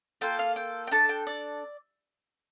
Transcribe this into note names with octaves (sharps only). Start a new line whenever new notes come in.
A#3 F4 A4 G5
F5
G5
G5
D4 A4 A5
G5
D5